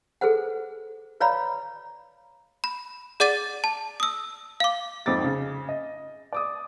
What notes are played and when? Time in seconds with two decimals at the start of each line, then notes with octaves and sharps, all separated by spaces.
0.21 G#4 A4 B4 C5 F#5
1.20 B4 C#5 D5 F5 A#5 B5
2.64 B5
3.20 G#4 D5 F#5 D6 A6 D#7
3.64 A5
4.00 D#6 E6
4.60 F5 D6
5.06 G#1 F2 D#4 D6 A6
5.24 C#3
5.69 D#5
6.32 D5 D6 D#6